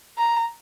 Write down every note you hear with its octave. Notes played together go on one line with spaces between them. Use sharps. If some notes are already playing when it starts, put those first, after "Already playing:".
A#5